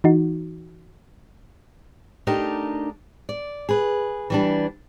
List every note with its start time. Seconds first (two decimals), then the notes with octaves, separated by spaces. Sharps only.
0.04 E3 D#4 F#4
2.27 A3 D4 D#4 G4 A#4 D#5
3.29 D5
3.69 G#4 B4
4.30 E3 G3 D4